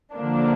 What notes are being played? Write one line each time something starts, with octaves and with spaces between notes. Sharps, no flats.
D3 F3 A#3 D4